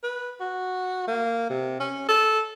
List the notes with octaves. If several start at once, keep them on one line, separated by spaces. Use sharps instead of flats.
B4
F#4
A#3
C3
C#4
A4